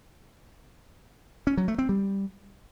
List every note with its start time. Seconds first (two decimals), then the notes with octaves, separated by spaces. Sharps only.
1.47 C#4
1.57 F#3
1.68 A3
1.78 C4
1.89 G3